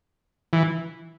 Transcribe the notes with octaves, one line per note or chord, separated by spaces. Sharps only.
E3